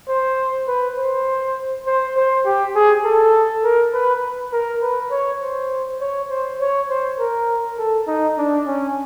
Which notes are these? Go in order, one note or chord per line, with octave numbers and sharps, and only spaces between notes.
C5
B4
C5
C5
C5
G4
G#4
A4
A#4
B4
A#4
B4
C#5
C5
C#5
C5
C#5
C5
A#4
A4
D#4
D4
C#4